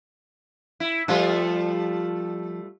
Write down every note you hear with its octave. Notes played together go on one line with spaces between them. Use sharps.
E4
F3 G3 A3 F4